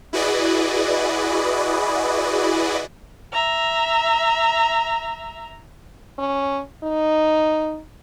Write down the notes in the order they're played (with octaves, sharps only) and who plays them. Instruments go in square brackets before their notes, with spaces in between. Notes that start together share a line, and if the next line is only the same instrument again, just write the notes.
[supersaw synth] E4 F#4 G#4 B4 D5 D#5
[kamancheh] E5 A#5
[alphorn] C#4
D#4